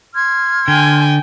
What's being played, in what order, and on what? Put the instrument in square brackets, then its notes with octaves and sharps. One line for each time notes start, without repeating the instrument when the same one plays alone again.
[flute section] C6 F6 G#6
[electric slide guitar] D3 [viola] G5 G#5